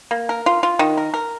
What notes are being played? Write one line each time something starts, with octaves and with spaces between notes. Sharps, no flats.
A#3
A#4
F4
F4
D#3
A#4
A#4